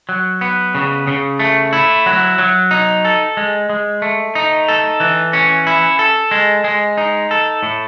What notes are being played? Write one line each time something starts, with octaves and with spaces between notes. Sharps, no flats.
F#3
B3
C#3
C#3
A3
E4
F#3
F#3
D#4
A4
G#3
G#3
A3
D#4
A4
E3
C#4
E4
A4
G#3
G#3
D#4
A4
A2